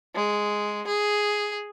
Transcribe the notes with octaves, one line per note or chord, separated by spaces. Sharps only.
G#3
G#4